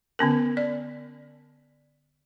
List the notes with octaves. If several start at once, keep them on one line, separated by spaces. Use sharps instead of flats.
D3 B3 C#4 A#4
D5